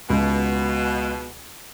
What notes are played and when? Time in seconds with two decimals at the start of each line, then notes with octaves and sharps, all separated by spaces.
0.10 C#2 B2